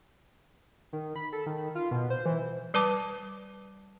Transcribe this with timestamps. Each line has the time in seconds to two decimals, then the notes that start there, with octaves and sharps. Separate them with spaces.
0.93 D#3
1.16 B5
1.33 A4
1.46 D#3
1.75 F4
1.91 B2
2.10 C5
2.26 E3
2.74 G3 B4 A5 D6